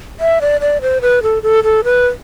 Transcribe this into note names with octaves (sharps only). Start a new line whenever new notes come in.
E5
D5
D5
C5
B4
A4
A4
A4
B4